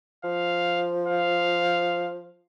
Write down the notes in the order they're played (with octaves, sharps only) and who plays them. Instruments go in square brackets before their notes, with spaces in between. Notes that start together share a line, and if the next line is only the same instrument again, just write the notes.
[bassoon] F3 [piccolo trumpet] F5
[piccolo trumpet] F5